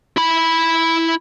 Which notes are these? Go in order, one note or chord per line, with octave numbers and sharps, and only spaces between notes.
E4 B5